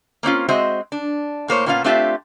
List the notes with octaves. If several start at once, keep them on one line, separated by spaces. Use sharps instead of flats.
A#3 C4 C#4 F4
G#3 C4 F#4 C5 D#5 E5
D4
A2 A#3 C5 C#5
A#2 B3 C#4 F4 F#4 F5
A3 C4 D4 F4 G4 E5